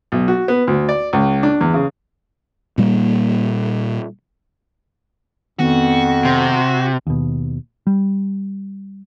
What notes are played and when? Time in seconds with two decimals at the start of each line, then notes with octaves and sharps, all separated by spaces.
0.12 B1
0.28 F#4
0.48 B3
0.67 D2
0.89 D5
1.13 C#2
1.43 D4
1.61 E2
1.74 C#3
2.78 A#2 G3 A#3
5.59 F2 D#3 B3 F#4
6.25 C3
7.07 D#2 B2
7.87 G3